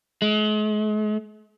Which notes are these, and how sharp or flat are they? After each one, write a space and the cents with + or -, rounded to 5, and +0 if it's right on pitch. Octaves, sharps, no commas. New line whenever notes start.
G#3 +45